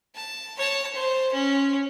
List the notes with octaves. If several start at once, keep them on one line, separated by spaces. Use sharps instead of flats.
A5
C#5 A5
C5
C#4